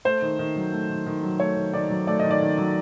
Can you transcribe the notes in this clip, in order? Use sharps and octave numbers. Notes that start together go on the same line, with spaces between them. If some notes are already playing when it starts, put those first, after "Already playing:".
A3 C5
D#3
D#3
F#3
A3
D#3
D#3
F#3
A3 C#5
D#3
D#3 D5
F#3
A3 D5
D#3 D#5
D5
D#3
F#3